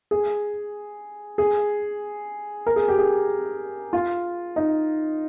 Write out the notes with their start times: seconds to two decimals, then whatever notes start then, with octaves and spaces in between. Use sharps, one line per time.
0.11 G#4
1.38 G#4
2.67 A#4
2.76 G#4
2.88 G4
2.98 G#4
3.93 F4
4.56 D#4